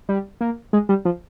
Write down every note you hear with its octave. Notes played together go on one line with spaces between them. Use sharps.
G3
A#3
G#3
G3
F3